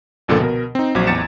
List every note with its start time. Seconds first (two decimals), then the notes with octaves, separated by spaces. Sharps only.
0.28 G1 C#2 A#2 D3 F3 A4
0.40 B2 A#4
0.75 C4 D#4
0.95 A#1 F#3 C5 D6 G#6
1.07 A1 E2 A6 C#7 E7